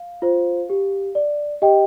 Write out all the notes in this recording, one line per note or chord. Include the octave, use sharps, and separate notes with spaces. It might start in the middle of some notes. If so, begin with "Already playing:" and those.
Already playing: F5
F4 C5
G4
D5
G4 D#5 G5